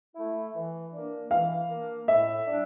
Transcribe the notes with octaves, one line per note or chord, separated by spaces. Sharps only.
A3 E4
E3
A#3 D4
E3 F5
A#3 D4
A2 E5
G3 D4